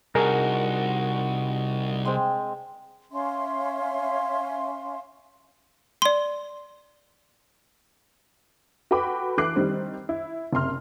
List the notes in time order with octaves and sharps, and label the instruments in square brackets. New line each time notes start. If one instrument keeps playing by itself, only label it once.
[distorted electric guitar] C2 [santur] D4 [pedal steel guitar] D#4 F#4 [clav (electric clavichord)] G#4 A#4
[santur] G#3 C4
[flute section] C#4 E5 F5 C6
[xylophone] D5 C6
[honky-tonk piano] F#4 A4 B4 G5 B5 D6
E3 A4 D6 F#6 C7
D#3 G3 C4
E4
F#1 C3 C6 F6